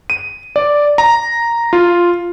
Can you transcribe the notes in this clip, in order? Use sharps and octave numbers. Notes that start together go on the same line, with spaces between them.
D#7
D5
A#5
F4